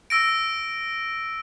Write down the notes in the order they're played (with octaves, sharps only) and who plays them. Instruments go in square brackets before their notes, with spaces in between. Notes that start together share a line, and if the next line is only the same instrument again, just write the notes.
[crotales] E6 A#6 D7